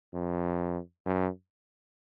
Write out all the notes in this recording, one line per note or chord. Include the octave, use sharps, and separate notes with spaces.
F2
F#2